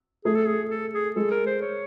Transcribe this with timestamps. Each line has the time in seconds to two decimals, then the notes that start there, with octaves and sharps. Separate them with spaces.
0.25 A3 G#4
0.35 A4
0.46 G#4
0.70 A4
0.94 G#4
1.16 G#3 A4
1.31 A#4
1.46 C5
1.61 C#5